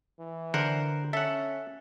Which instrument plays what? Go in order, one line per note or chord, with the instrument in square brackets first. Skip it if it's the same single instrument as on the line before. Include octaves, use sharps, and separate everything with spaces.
[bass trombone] E3
[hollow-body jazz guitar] D3 [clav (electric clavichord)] A#4 C5 F#5
[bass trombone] C#4 [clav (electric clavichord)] A4 F#5 [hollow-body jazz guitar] E5